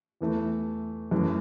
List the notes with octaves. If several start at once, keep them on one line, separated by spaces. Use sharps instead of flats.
E2 E3 A3
F#2 E3 A3